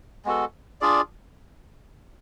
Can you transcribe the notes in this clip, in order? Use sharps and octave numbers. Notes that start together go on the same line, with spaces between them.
G#3 B3 F#4 A4
D4 F4 G#4 D5